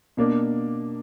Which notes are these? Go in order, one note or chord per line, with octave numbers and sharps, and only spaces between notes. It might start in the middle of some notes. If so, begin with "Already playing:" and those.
B2 A#3 D4